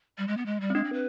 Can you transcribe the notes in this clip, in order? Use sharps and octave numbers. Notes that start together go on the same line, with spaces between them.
G3
G#3
B3
G#3
G3
C4
G#3 D4
C4
B4